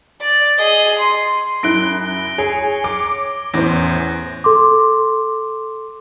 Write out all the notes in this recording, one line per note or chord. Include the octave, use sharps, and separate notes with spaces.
D5
G#4 D#5
C6
F#2 E4 F#6 A#6 D7 G7
G#4 C#5
D6
E2 A2 E3 C#4 C5 A#6
A4 C6 D6